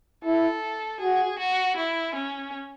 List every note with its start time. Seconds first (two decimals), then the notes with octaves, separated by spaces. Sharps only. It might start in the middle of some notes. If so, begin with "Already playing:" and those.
0.25 E4 A4
1.00 F#4 G#4
1.39 F#4
1.76 E4
2.14 C#4